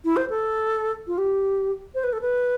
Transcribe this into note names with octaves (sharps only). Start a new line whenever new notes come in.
E4
C5
A4
F4
G4
C5
B4
A4
B4